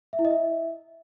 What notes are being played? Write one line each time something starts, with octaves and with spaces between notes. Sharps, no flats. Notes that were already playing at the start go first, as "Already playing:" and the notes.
E5
E4
D#5
E5